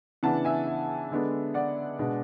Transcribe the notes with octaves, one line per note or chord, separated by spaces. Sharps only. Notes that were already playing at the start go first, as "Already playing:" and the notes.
C#3 E3 B3 D4 F#5 A5
E5 G#5
E5
D3 G#3 B3 D4
D5 F#5
B2 G#3 D4